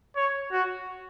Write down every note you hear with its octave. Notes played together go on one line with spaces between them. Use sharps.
C#5
F#4